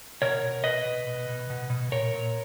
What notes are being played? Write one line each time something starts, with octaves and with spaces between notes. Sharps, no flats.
B2 A#4 C#5
B2
B2 B4 D#5
B2
B2
B2
B2
B2
A#2 A#4 C#5
A#2